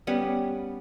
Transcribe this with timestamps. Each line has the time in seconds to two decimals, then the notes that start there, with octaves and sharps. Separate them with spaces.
0.07 G3 B3 C#4 F#5